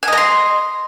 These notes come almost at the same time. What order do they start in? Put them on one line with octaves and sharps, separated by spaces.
G#5 D#5 A#5 C6